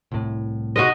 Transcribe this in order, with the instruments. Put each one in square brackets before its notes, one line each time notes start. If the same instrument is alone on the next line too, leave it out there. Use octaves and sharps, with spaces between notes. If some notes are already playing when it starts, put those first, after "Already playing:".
[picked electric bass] C2 A2
[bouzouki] G#3 D#4 F#4 [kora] D#5